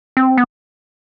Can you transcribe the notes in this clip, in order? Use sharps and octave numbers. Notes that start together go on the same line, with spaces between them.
C4
B3